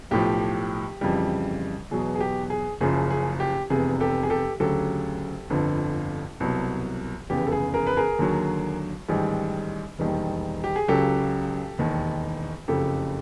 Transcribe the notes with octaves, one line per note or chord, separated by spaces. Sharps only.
B1 A2 F3 G4
F2 C#3 E3 G3
E2 B2 F#3 G#4
G#4
G4
G#4
F#1 F#2 C#3 F3 G#4
G#4
G4
F1 E2 C3 G#4
G4 A4
G#4
G4 A4
D2 C#3 F#3 G4 A4
G1 F2 D3
C2 B2 F#3
F1 E2 C#3 G4
A4
G#4
G#4 A#4
B4
G#4 A#4
D#2 D3 F#3
A1 G#2 D#3 G3
E1 D#2 D#3 G3
G4
G#4
C#2 C#3 F#3 G4 A4
E1 D#2 D#3
F#1 F2 C#3 G4 A4